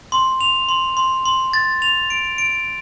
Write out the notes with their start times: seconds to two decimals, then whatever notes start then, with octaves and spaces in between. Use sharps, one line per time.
0.12 C6
0.41 F7
0.69 C6
0.97 C6
1.26 C6
1.53 A6
1.82 F7
2.10 D7
2.38 D7